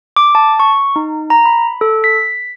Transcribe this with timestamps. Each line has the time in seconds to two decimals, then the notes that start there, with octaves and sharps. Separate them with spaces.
0.16 D6
0.35 A5
0.60 C#6
0.96 D#4
1.30 A#5
1.46 B5
1.81 A4
2.04 B6